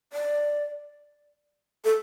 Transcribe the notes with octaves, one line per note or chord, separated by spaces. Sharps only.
D5
A4